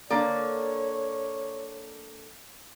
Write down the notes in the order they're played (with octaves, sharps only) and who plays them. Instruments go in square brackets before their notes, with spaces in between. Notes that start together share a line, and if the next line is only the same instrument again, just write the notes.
[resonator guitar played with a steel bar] D3 A#3 D5 [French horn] C#5